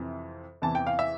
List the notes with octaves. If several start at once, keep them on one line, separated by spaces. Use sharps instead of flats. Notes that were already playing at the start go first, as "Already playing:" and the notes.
Already playing: F2 C3 E3
E2 C3 E3 A5
G5
F5
E5